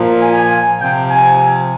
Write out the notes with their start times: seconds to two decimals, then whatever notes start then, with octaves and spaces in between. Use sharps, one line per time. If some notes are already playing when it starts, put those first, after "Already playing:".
Already playing: A#2 F3
0.22 G#5
0.80 C3 F3 G5
1.10 G#5